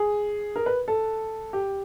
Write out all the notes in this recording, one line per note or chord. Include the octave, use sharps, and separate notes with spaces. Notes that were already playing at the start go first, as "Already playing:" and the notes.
Already playing: G#4
A#4
B4
A4
G4